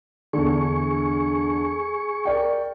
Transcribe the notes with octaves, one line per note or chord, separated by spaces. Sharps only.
E2 D3 G#4 C#6
A#4 D5 G5